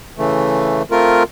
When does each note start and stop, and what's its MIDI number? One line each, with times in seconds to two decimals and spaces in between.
0.18 0.83 49
0.18 0.83 52
0.18 0.83 57
0.91 1.23 57
0.91 1.23 60
0.91 1.23 65
0.91 1.23 70